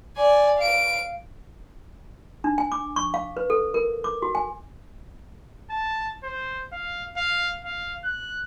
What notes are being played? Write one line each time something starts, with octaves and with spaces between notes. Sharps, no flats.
D5 G#5
F5 D7
D4
G#5
D6
C#6
F5
B4
A4
A#4
D6
F#4
G#5
A5
C5
F5
F5
F5
F#6